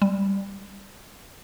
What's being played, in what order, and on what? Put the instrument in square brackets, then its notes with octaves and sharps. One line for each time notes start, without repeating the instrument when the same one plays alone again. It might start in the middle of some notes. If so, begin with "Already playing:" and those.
[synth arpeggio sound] G3